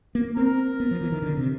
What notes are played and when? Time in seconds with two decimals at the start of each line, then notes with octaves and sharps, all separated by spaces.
0.15 A#3
0.36 C4 A#4
0.80 B3
0.91 F3
1.01 E3
1.12 D#3
1.22 D3
1.37 C3